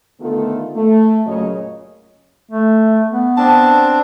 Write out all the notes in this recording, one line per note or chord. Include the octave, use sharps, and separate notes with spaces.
D3 D#3 A3 B3 F4 A4
A3
F#2 A#2 C#3 F#3 C#5 D#5
A3
B3
C4 D4 A5